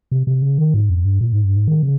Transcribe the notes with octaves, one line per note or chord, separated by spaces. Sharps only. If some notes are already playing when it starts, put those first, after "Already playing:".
C3
C3
C#3
D#3
G#2
F2
G2
A#2
G#2
G2
G#2
D#3
C#3